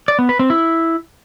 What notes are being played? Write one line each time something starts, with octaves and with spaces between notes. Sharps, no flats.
D5
B3
B4
C4
E4